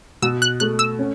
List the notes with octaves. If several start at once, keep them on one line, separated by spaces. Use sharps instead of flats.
B2 E6
F#6
A3 F#6
E6
C#4